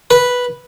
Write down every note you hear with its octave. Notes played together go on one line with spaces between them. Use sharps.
B4